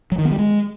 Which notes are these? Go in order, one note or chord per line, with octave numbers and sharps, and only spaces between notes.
F#3
D#3
B3
G3
G#3